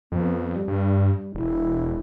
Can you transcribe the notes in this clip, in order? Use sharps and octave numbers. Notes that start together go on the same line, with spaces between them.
F2 B3
G3
G2
E1 E4